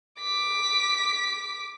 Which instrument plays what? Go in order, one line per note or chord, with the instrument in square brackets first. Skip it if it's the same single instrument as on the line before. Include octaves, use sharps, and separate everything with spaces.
[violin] D6 B6